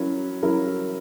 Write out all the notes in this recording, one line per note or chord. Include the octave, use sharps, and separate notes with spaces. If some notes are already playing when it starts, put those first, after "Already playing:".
Already playing: F#3 C#4 E4 A#4
F#3 C#4 E4 A#4